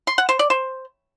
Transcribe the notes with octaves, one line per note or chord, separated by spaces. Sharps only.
C6
F#5
C5
D5
C5